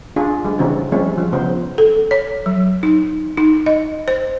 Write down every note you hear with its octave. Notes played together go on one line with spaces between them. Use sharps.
D4 F4 G#4
G3 G#3
C#3 E3 C4 D4 F#4
F3 G3 G#3 C4 C#4
F3
C#3 F3 B3 C5
A4
C#5
F#3
D#4
D#4
D#5
C5